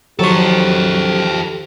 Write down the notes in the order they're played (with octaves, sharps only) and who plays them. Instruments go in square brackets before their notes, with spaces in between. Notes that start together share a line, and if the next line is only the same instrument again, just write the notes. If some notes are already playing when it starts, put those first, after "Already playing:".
[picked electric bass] D#3 F3 [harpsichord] F#3 C#5 [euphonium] G4 [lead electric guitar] A4 C5